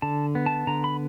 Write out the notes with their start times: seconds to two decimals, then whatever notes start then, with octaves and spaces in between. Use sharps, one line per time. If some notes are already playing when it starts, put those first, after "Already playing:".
0.02 D3 A5
0.35 B3
0.46 A5
0.67 D3 A#5
0.84 B5